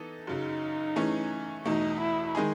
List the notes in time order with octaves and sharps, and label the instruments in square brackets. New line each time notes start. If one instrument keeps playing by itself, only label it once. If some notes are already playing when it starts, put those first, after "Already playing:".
Already playing: [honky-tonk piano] E3 B3 D#4 A4
[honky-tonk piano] F#2 C#3 F#3 [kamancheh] D#4
[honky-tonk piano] E3 A3 C#4 G#4
[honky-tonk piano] E2 B2 A3 [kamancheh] D#4
[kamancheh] E4
[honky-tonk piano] D#3 G#3 D#4 G#4